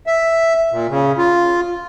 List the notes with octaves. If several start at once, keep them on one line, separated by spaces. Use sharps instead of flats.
E5
A#2
C#3
F4